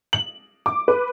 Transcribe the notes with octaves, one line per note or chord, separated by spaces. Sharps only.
F#7
D6
B4